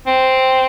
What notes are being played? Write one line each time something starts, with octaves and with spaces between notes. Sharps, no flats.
C4